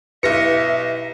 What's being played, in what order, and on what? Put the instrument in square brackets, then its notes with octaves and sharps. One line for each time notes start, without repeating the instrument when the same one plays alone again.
[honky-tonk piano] B1 A#6 C#7 [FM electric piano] E4 G4 [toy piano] B4 [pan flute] E5